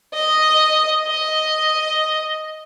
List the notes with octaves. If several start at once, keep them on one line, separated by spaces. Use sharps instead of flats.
D#5
D#5